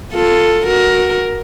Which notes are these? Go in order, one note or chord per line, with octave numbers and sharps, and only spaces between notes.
F4 A4
F#4 A#4